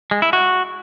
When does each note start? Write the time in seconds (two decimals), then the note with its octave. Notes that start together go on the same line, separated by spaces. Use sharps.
0.11 G#3
0.22 E4
0.33 F#4